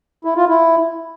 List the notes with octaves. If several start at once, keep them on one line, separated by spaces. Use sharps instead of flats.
E4
F4
E4